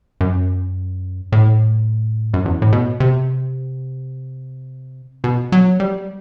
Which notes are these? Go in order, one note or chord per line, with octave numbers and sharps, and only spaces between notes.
F#2
A2
F#2
E2
A2
B2
C3
B2
F#3
G3